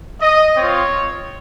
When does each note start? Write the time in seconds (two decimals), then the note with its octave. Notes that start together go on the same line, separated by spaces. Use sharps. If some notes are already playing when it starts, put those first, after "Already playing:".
0.21 D#5
0.57 C4 F4 C#5